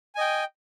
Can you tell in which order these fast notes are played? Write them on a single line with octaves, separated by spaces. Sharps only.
G#5 D#5 G5